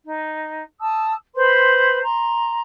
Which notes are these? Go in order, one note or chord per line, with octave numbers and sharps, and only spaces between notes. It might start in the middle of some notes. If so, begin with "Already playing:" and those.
D#4
A5 D#6 E6
B4 C5 B5 C6
A#5 C6